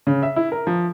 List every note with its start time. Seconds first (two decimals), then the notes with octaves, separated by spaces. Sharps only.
0.07 C#3
0.23 E5
0.36 E4
0.52 A#4
0.67 F3